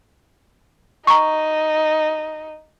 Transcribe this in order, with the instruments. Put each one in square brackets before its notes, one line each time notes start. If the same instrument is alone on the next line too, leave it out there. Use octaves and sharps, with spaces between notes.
[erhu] D#4 [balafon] A#5 C#6